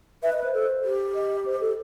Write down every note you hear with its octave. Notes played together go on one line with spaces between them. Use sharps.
B4 E5
D#5
B4
C5
A4
G4
D#5
C5
A4